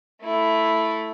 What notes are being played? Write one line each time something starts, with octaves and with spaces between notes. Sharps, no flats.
A3 E4